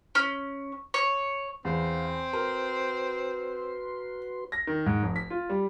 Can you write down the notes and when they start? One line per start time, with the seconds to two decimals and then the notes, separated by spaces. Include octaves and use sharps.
0.15 C#4
0.94 C#5
1.65 E2 C4 F5 F#5 B5
2.33 F#4 A#4 B4 C6
4.52 A#6
4.67 D#3
4.86 G#2
5.02 F1
5.16 B6
5.30 F4
5.50 G3